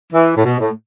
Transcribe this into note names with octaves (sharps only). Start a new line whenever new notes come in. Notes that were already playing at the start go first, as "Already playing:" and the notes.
E3
A2
B2
A2